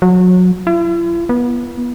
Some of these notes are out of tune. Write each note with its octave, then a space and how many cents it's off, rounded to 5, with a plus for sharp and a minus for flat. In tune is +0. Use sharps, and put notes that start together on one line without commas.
F#3 -25
E4 +45
B3 -30